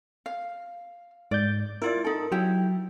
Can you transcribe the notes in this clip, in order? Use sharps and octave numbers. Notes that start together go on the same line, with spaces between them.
F5
G#2 D5 G6
E4 F4 A#4 D5
D#4 A4
F#3 E4 G4